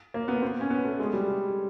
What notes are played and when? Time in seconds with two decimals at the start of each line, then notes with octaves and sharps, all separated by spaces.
0.14 A#3
0.28 B3
0.42 C4
0.61 C#4
0.70 B3
0.84 A3
0.99 G#3
1.13 G3